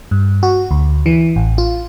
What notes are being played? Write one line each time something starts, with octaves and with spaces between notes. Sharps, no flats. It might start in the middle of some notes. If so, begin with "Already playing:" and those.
G2
F#4
D2
E3
A1
F4